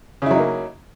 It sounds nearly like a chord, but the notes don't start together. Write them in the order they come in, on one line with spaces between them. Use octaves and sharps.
C#3 E4 F#3 D#4 A#3